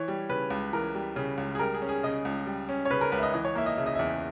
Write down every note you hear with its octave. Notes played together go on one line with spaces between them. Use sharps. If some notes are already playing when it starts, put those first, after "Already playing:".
Already playing: E3 C#5
G3
C#3 B4
C#2
E3 A#4
G3
C#3
C#2
G#4
G3 A#4
G#4
C#4
G#4
C#3 D#5
C#2
G3
C#4
C#5
C#3 B4
A#4
C#2 B4
E5
D#5
E3 D#5
C#5
A#3 E5
D#5
C#3 E5
D#5
E2 E5